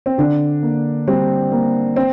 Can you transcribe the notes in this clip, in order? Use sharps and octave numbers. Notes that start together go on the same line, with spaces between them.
C4
D3 D4
A#3
G3 C4
A#3
C4